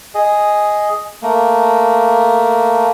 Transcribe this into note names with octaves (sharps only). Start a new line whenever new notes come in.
G#4 D#5
A3 A#3